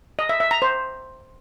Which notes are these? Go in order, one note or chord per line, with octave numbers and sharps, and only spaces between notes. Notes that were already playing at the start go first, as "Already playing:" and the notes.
D#5
E5
E5
A#5
C5